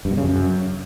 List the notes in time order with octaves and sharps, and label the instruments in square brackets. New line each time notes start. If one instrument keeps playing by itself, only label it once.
[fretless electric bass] G2
B2
C#3
F#2